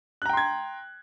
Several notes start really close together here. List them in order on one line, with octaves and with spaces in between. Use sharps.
F#6 A#5 G5 C6 G#6